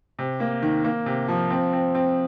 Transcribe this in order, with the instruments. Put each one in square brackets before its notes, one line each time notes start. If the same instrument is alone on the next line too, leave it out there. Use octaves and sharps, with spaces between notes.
[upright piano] C3
A#3
D#3
A#3
C3
F3
C4
C4
C4